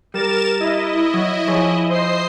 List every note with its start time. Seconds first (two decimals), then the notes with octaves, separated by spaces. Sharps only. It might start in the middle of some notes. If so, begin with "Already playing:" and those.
0.14 G3 A#4 A6 E7
0.60 E4 D#5
1.14 F#3
1.47 F3 G#4 C#5
1.89 C5 D#5 C7